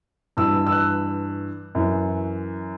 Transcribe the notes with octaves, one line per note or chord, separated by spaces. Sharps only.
G2 E3 E6
E6
F#6
F#2 E3